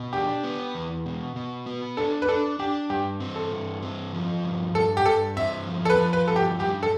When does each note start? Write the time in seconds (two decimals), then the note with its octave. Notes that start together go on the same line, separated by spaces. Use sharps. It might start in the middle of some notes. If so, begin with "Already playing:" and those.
Already playing: B2
0.13 D4 G4
0.44 B3
0.75 E2
1.06 B2
1.36 B2
1.66 B3
1.97 D4 A4
2.22 B4
2.28 D4 A4
2.59 D4 G4
2.90 G2 G4
3.20 C4
3.36 A4
3.52 G2
3.82 C4
4.13 F3
4.44 G2
4.75 G2 A4
4.97 G4
5.06 G2 A4
5.36 C4 E5
5.67 F3
5.85 A4
5.90 B4
5.98 F3
6.13 B4
6.28 G2 A4
6.36 G4
6.59 G3 G4
6.83 A4